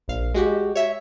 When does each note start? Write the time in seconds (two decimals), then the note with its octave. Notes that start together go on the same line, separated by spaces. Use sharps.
0.08 A#1 F5
0.34 G#3 F#4 G4
0.76 C#5 E5